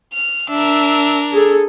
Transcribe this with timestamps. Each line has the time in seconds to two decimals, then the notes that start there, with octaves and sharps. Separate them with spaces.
0.14 F6
0.50 D4 A#4 E5
1.32 G#4 A4